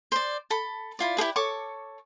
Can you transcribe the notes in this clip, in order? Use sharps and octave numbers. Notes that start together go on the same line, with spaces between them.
C5 D5
A4 B5
E4 F4 D5
E4 G4 G#4 B4
A4 C#5 C#6 D6